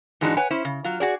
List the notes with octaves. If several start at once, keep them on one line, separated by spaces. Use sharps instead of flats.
G#2 E3 G#3 D4 D#4 F#4
B4 C#5 F#5 G#5
C#4 E4 C5
C#3
F#3 F4
F#4 G#4 D5